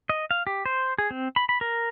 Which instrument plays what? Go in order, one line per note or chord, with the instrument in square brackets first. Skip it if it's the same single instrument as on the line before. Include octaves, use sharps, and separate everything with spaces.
[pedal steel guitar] D#5
F5
G4
C5
G#4
C4
B5
B5
A#4